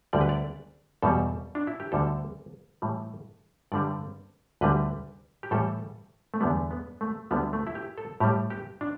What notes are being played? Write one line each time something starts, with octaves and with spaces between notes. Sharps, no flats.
D2 D3 G3 D5
B4
D5
E2 B2 G3 A4
D4
E4
G4
D2 D3 G3 A4
A2 E3 G3
G2 D3 G3 D5
D2 D3 G3 B4
G4
A2 E3 G3 A4
A3
E2 D3 G3 B3
B3
A3
D2 D3 G3 B3
A3
E4
G4
A4
A2 G3 G4
G4
D4